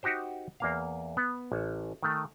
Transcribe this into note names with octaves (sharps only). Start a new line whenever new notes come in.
D#4 F#4 G4 C5
E2 A#3 F5
B3
A1
D#3 A3